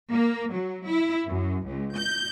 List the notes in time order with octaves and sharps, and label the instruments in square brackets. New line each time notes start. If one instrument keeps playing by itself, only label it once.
[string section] A#3
F#3
E4
F#2
C#2
G6